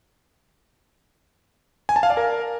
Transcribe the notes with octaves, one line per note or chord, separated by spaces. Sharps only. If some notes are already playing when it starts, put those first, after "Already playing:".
G#5
A5
F5
D5
A#4